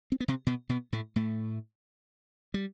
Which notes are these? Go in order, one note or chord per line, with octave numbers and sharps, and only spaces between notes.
C4
B3
C3 C4
B2 B3
B2 B3
A2 A3
A2 A3
G3